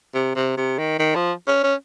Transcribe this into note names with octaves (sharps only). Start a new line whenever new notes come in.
C3
C3
C3
D#3
D#3
F3
C#4
C#4